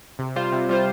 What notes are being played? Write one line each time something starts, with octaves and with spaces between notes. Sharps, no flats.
C3
G3 F4 C5
C3
G3 F4 C5